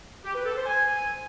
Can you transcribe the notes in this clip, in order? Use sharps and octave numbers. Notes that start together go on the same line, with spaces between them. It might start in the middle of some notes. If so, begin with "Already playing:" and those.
G4
B4
A4
C5
G#5